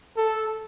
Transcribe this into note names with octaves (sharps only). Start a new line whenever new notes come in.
A4